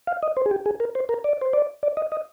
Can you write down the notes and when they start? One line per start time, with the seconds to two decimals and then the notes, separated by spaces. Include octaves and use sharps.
0.07 F5
0.23 D#5
0.37 C5
0.46 G#4
0.51 G4
0.66 G#4
0.80 A#4
0.95 C5
1.09 A#4
1.24 D5
1.41 C5
1.53 D5
1.83 D5
1.97 D#5
2.12 D#5